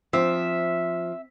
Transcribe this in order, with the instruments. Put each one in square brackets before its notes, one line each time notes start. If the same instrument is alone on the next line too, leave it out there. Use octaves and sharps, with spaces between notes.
[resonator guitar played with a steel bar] F3 [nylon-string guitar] C4 [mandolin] E5